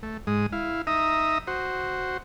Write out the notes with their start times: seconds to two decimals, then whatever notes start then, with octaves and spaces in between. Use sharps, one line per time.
0.03 A3
0.27 G#2 G#3 D#6
0.52 E4 F5
0.87 D#4 E5 A#5 D#6
1.47 F#4 C5